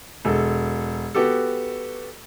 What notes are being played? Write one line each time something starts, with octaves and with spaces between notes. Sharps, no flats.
E1 A4
B3 F#4 G4 A4